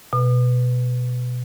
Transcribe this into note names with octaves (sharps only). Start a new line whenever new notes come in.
B2